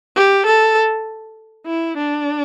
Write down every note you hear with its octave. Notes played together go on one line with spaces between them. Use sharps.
G4
A4
E4
D4